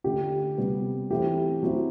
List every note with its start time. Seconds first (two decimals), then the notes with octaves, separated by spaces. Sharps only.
0.04 D3 A3 D4 G4
0.58 C3 G3 B3
1.10 E3 A3 C4 E4 G4
1.63 F#3 C4 E4